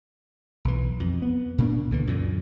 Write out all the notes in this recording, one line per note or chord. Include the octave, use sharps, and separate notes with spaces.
B1 E3
F2
B3
A#2 A#3 D4
C#2 D3 E3
F#2 A#2 D3